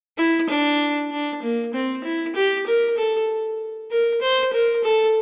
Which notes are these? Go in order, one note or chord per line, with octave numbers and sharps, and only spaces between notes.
E4
D4
D4
A#3
C4
E4
G4
A#4
A4
A#4
C5
A#4
A4